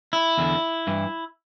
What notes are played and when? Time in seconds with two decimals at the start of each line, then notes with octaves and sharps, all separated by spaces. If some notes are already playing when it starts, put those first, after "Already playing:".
0.13 E4
0.38 E2 D3
0.87 G2 E3